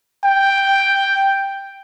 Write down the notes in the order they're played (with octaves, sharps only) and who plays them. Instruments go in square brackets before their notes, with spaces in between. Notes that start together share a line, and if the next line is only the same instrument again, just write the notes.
[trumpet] G5